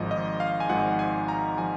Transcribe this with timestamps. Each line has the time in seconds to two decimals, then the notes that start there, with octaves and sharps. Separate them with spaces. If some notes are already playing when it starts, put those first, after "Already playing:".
Already playing: G#1 G#2 F3 D#5
0.11 D#5
0.40 F5
0.60 G#5
0.69 G#1 G#2 F3 F#5
0.99 G#5
1.28 A#5
1.58 F3 G#5